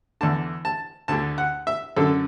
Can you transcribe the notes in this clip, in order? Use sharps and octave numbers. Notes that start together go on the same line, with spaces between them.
E2 D3 A5
A5
D2 D3 A5
F#5
E5
F#2 D3 A4